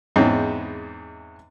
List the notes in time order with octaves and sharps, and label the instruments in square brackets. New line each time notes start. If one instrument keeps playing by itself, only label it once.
[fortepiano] E2 G#2 C4 C#4 D#4 G5